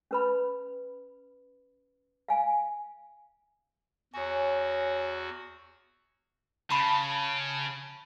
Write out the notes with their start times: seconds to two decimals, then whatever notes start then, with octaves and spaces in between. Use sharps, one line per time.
0.11 C#4 B4 B5
2.28 F5 G#5
4.14 E2 F#4 C#5 G#5
6.70 C#3 A5 B5